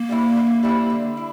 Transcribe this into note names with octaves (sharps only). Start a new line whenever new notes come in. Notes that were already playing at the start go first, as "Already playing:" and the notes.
Already playing: A#3
G3 C4 E4
D3
G3 C4 E4
D3
E4